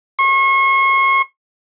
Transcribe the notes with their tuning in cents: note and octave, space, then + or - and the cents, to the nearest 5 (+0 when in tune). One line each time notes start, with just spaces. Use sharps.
C#6 -40